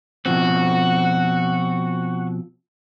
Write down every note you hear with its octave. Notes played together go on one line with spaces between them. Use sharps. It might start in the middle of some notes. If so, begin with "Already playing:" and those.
B2 F3 C4 F#4